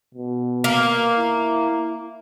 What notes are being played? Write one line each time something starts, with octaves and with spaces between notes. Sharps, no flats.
B2
A#3
E4